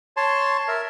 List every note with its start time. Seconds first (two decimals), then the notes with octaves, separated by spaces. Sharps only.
0.17 C#5 A5 C6
0.68 A#4 E5